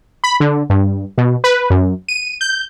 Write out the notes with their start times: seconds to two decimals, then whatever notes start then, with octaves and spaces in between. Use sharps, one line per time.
0.24 B5
0.40 D3
0.70 G2
1.18 B2
1.44 B4
1.70 F#2
2.08 D#7
2.41 G6